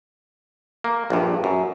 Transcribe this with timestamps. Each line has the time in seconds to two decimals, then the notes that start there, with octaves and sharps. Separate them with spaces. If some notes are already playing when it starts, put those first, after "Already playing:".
0.84 A#3
1.10 A#1 G2
1.44 F#2